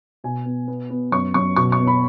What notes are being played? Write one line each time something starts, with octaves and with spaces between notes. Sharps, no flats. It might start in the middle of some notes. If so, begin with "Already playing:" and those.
B2 G#5
B3
B3
B3
F#2 C#6
F#2 C#6
B2 C#6
C#6
B3
B5